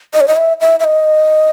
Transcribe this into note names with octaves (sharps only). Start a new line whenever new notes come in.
D#5
C#5
D#5
E5
E5
E5
D#5